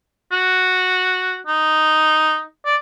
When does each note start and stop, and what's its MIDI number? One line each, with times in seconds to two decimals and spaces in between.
0.32 1.38 66
1.47 2.42 63
2.65 2.76 74